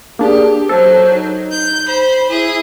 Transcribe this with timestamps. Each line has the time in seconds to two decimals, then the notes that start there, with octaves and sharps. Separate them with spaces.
0.19 A#3 D4 G4 G#4
0.69 F#3 A4 C5
1.14 D#4
1.50 G6
1.86 C5 B5
2.29 E4 G#4